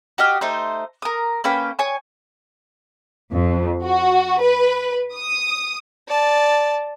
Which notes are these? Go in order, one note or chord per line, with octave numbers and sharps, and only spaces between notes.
F#4 G4 D#5 F6
A3 D#4 C5
A#4 D#6
A#3 C#4 B4 G5
C#5 G#5 D#6
F2
F#4
B4
D#6
D5 A5